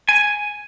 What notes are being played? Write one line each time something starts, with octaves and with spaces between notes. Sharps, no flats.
G#5